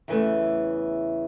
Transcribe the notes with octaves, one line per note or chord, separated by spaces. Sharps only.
E2 C#3 E3 A3